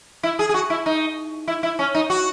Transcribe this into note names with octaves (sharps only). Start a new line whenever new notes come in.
E4
G#4
G#4
F#4
E4
D#4
E4
E4
C#4
D#4
F#4